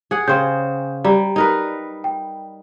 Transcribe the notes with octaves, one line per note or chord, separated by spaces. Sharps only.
G#4 F#5
C#3 C5 G5 G6
G3 D5 G5 A#5
D#4 A#4 B4
G5